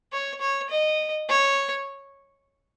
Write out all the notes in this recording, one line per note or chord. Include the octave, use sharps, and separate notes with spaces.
C#5
C#5
D#5
C#5